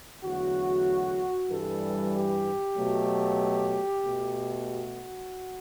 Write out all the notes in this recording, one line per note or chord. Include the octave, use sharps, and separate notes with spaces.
E2 D3 F#3 A3 F#4
G2 E3 G3 A4
G4
B2 F#3 A3
B2 A3
F#4